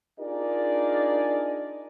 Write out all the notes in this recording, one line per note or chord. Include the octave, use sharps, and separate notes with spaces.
D4 D#4 F4 G#4 A#4 D5